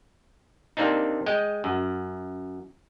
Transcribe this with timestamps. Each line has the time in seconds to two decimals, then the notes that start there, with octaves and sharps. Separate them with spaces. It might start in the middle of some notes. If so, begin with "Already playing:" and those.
0.77 C3 A#3 C4 D4 D#4
1.26 G#3 D#5 G5
1.64 F#2